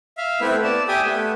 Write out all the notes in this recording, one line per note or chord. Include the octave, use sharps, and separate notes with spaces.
E5 F5
A3 B3 C4 E4 B4
D5 A5
G4 E5 G5 G#5 D#6
A3 B3